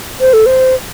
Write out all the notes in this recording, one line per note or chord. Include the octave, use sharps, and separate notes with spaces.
C5
A4
C5